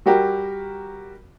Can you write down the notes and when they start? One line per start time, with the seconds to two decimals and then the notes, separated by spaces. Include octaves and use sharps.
0.06 G3 F#4 G4 A#4